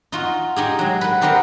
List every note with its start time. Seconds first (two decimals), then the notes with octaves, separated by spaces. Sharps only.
0.12 D#4 F4 F#4
0.56 D#4 G4 G#4
0.79 F#3 G#3
1.01 B4 F#5
1.21 C4 D#4 G4 A#4 B4 F#5